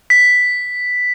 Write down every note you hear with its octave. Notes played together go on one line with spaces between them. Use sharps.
B6